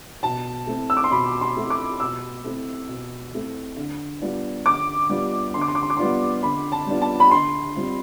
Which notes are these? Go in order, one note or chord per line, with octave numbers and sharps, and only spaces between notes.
B2 A5
A3 C4 E4
E6
D6
C6
B2 B5
C6
A3 C4 E4
D6
B2 E6
A3 C4 E4
B2
A3 C4 E4
D3
G3 B3 D4 F4
D3 D6
G3 B3 D4 F4
D3 C6
D6
C6
D6
C6
D6
G3 B3 D4 F4 C6
D3 B5
A5
G3 B3 D4 F4
A5
B5
D3 C6
G3 C4 F4